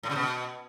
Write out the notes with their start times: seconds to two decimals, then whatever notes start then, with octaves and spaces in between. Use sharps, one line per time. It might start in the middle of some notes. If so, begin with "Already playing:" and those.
0.03 A2
0.09 C#3
0.16 B2